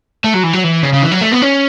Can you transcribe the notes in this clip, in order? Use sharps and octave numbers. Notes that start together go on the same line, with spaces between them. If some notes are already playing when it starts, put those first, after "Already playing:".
A3
F#3
E3
F#3
E3
C#3
C#3
E3
F#3
A3
B3
C#4